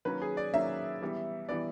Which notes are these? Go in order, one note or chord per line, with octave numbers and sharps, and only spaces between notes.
D#3 F#3 A#3 C#4 B4
G#4
D5
D#3 F#3 A#3 C#4 E5
E3 G3 B3
E3 G3 B3 D5